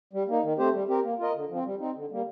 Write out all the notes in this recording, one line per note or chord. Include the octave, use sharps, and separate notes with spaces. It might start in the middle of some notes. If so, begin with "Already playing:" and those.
G3
A#3 D#4
D#3
A3 C4 G4 C5
G3
C4 G4 A#4
A#3
F4 A#4 D#5
D3
F3 C4
G3
C4 D#4
D3
G3 A#3